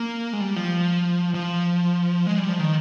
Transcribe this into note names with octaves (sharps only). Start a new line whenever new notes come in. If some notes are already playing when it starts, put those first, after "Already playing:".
Already playing: A#3
G#3
G3
F3
F3
G#3
G3
F3
D#3